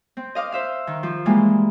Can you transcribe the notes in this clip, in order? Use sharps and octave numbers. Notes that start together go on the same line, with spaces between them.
C4
D#5 F5 D6
C5 E5 F5
D#3
F3
E3 G3 G#3 A#3